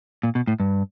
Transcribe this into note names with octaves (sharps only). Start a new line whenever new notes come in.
A#2
B2
A2
G2